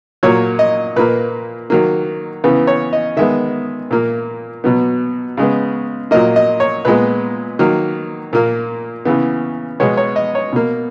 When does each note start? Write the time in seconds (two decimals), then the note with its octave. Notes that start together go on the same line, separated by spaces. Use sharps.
0.23 A#2 F#3 A#3 C#5
0.59 D#5
0.96 A#2 A#3 B4
1.70 D#3 F#3 A#3
2.44 C#3 E3 B3 B4
2.67 C#5
2.93 D#5
3.16 D#3 G#3 B3 E5
3.91 A#2 A#3
4.64 B2 F#3 B3
5.37 C#3 G#3 B3
6.11 A#2 F#3 A#3 D#5
6.36 D#5
6.60 C#5
6.85 A#2 G#3 B3 B4
7.59 D#3 F#3 A#3
8.33 A#2 A#3
9.05 C#3 E3 B3
9.80 B2 G#3 B3 C#5
9.97 C#5
10.16 D#5
10.35 C#5
10.53 B2 A#3